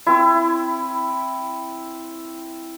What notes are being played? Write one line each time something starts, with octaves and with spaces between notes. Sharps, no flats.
C4 E4